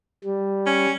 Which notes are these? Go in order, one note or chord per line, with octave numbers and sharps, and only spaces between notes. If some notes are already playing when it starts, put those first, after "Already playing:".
G3
C#4